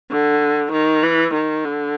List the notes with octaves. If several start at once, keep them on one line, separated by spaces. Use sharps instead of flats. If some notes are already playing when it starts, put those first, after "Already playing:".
D3
D#3
E3
D#3
D3